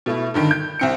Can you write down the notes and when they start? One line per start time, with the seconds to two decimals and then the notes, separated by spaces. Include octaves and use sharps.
0.06 B2 A3 E4
0.34 G2 D3 D#3
0.51 G6
0.79 C2 C4 C#7